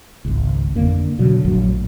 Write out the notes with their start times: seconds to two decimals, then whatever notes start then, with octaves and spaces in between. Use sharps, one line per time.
0.25 G#1 C#2
0.75 F2 D3 A#3
1.19 B2 D3 F#3
1.45 A#1 F#2 A2 F#3